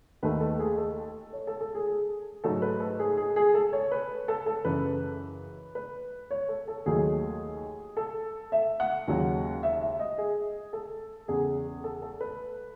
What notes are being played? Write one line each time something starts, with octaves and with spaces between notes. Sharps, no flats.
D#2 D#3 A3 B4
A4
G#4
A4
C#5
A4
A4
G#4
G#4
G#2 F#3 A3 A4
B4
A4
G#4
G#4
G#4
A4
C#5
B4
A4
A4
F#2 C#3 E3 G#3 B4
B4
C#5
A4
A4
D#2 D#3 F#3 A3 G#4
A4
E5
F#5
D#2 C#3 F#3
E5
E5
D#5
G#4
A4
E2 C#3 G#3 G#4
A4
A4
B4